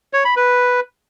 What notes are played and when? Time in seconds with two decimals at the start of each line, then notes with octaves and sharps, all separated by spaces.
0.13 C#5
0.25 B5
0.36 B4